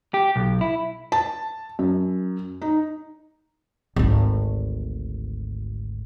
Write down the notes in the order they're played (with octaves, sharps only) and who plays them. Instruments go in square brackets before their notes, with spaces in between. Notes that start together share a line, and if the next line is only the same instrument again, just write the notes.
[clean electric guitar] G4
B1
E4
[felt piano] A5
F#2
D#4
[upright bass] G#1 D2